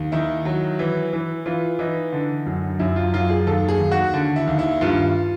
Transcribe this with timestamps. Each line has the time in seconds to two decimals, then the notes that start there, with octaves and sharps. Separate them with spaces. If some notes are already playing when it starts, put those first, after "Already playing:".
Already playing: D#2
0.12 D#3 E4
0.45 F#3
0.79 E3
1.13 E3
1.46 E3 F4
1.79 E3 D#4
2.12 D3
2.46 F#2
2.79 F#2 E4
2.96 F4
3.13 F#2 F4
3.30 G#4
3.46 D#2 A4
3.69 G#4
3.80 D#2
3.91 F#4
4.14 D3
4.36 E4
4.47 D#2
4.59 E4
4.81 G2 F4